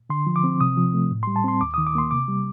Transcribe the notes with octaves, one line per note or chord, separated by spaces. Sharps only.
D3 C6
F3
D6
C4
C3 D#6
F3
A3
A2
C6
G3
A5
C4 C6
D#2 D6
D#6
D#3
D6
A#3 C6
C3 D6
G3